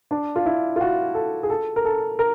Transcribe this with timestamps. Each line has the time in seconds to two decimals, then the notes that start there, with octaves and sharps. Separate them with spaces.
0.11 D4
0.36 F4
0.46 E4
0.76 F4
0.81 F#4
1.14 A4
1.43 G#4
1.50 A4
1.76 A#4
1.85 A4
2.19 A#4